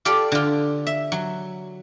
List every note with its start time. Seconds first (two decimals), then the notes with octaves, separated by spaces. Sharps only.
0.05 F4 G4 A4 D5
0.32 D3 F4
0.87 E5
1.12 F#3